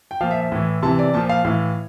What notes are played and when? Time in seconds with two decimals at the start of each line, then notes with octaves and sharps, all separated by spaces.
0.11 G5
0.21 A#2 F3 F5
0.31 E5
0.41 E5
0.52 A2 E3
0.83 C3 E3 A5
0.99 D5
1.14 A#2 F3 A5
1.29 F5
1.45 A2 E3 F5